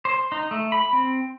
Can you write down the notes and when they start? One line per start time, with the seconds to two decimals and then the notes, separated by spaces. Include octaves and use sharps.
0.05 C5
0.32 D#4
0.51 A3
0.72 B5
0.93 C4